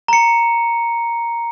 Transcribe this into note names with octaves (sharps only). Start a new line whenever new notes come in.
A#5 C#7